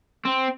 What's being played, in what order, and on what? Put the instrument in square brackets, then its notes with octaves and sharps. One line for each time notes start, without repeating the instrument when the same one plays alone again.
[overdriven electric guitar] C4